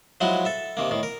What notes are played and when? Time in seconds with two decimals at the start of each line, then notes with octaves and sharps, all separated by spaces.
0.21 F3 F#3 G#3 E4 F#4
0.45 A4 E5
0.77 C3 D#3 A#3
0.91 A2 D#3
1.03 A#4